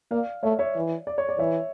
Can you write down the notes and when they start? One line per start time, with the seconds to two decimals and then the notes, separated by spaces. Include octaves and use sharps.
0.11 A#3 D5 F5
0.43 A3 C#5 E5
0.59 C#5 E5
0.75 E3
1.07 D5
1.18 C#5
1.29 D5
1.39 E3 C#5 E5